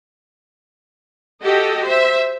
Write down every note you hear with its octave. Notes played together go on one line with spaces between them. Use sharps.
F#4 G4 A4 D#5
C5 E5